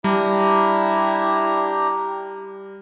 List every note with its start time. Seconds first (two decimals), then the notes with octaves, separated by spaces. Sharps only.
0.04 G3 D4 E4 G4 A#5